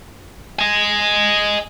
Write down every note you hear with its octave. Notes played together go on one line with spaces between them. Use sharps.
D#5 G#5